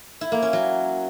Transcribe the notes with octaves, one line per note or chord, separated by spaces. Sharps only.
E4
A#3
C#4
F#3